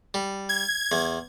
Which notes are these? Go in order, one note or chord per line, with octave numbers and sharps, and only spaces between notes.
G3
G#6
E2